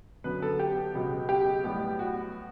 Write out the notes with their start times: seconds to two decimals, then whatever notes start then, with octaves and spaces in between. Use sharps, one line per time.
0.24 F#2 D3 F#3 B3 B4
0.42 A4
0.59 G4
0.95 C#2 B2 F#3 B3
1.29 G4
1.64 B1 A2 G3 B3
1.99 F#4